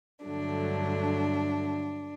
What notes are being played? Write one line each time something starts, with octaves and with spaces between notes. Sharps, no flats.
G2 D3 F#3 A3 D4